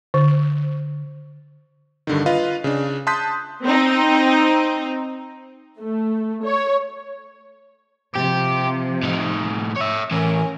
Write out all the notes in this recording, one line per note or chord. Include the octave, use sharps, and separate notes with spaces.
D3
G2 D3 D#3
F4 B4 D#5 F5
C#3 D4
A5 C6 D#6 F#6 G6 B6
C4 D#4
A3
C#5
C3 F3 G4
A2 D#4
C#5 E5
A2 E3 C#4 A#4